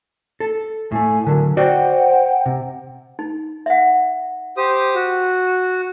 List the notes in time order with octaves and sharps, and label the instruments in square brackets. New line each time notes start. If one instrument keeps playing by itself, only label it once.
[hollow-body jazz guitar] A4
[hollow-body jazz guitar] A2 A3 [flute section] G#5
[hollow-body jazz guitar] D3 F#3 [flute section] A#4
[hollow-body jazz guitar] F#4 D5 D#5 [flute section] C5 F#5 G5
[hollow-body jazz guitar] C3
[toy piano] D#4
E5 F#5
[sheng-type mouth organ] G4 C5 D#6
F#4